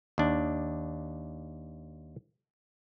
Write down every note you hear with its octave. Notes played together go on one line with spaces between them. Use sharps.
D#2 D4